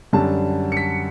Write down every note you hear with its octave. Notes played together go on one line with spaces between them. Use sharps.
F#2 D3 G3 A5
C#7
B6